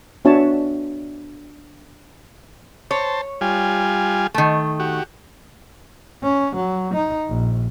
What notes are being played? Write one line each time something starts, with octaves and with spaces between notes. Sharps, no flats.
B3 D4 F#4 C#5 E5 A5
C5 C#5 A5
G3 F4 G#5
D#3 A3
F#4 G4
C#4
F#3
D#4
A#1